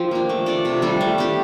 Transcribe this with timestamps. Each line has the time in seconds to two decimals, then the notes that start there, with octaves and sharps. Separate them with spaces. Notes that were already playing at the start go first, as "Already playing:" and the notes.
Already playing: F3 C4 G4 C5
0.11 A#3 D4
0.29 A3
0.46 D4 A4 D5
0.65 C3
0.82 G3 D4 A4
1.01 A3
1.18 D4 G4